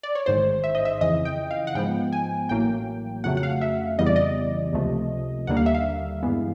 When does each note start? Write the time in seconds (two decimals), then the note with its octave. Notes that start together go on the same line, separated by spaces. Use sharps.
0.03 D5
0.15 C#5
0.26 A1 G#2 D#3 G#3 C5
0.64 E5
0.75 D#5
0.85 E5
1.01 F2 C#3 E3 D#5
1.25 G5
1.51 F5
1.67 F#5
1.75 G#2 F3 G#3 B3 G5
2.12 G#5
2.49 A1 A2 F#3 A#3 G5
3.24 F2 C#3 F#3 A3 F#5
3.37 F#5
3.43 F5
3.61 E5
3.98 F2 C#3 E3 G3 B3 D#5
4.06 D5
4.16 D#5
4.73 C#2 C3 F3 A3
5.47 D#2 D3 G3 A#3 F#5
5.57 F5
5.66 E5
5.75 F5
6.23 G2 E3 G#3 B3